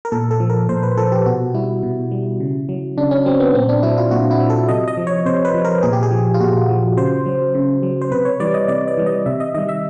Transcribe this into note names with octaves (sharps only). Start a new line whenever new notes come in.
A#4
A#2 A4
A4
F3
A#4
A#2 C5
B4
F3 A4
G4
B2 F#4
G3 E4
B2
G3
C#3
F#3
C#3 D4
C#4
F#3 C4
B3
A#2 C4
D4
F#3 E4
F4
A#2 F#4
E4
F#3
A4
C3 D#5
D#5
F3
C#5
C3 C5
B4
F3
A#4
A#2 G#4
G4
G#4
F3
F4
A#2 F#4
F3
C#3 C5
F#3
C#3
F#3
C5
C3 B4
C#5
E3 G3 D5
D#5
C3 D5
D5
E3 G3
D#5
C3 E5
D#5
D#3 G3 D#5
E5